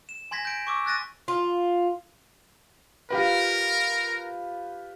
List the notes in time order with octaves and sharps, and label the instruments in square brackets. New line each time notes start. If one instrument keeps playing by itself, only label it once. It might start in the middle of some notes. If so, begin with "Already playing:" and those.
[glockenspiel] E7
G#5 C6 G#6 A#6 B6
G6 D7
C#6 D6 E6 B6
E6 F#6 A6 A#6 D#7
[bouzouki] F4
[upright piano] F4 G4 B4 [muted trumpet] A#4